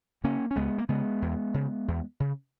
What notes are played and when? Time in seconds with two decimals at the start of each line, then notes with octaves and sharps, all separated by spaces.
0.24 C#3 A#3 C#4
0.51 C#4
0.56 C#2 G#3 B3
0.78 A#3
0.89 C#3 G#3 B3
1.22 E2
1.54 C#3
1.88 E2
2.20 C#3